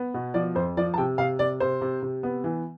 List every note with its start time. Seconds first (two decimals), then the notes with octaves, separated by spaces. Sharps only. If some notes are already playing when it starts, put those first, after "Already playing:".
Already playing: B3
0.14 B2
0.34 F3 D5
0.55 F2 C5
0.77 F3 D5
0.94 A5
0.98 C3 G5
1.18 C3 F5
1.39 C3 D5
1.60 C3 C5
1.82 C3
2.03 C3
2.23 B3
2.44 E3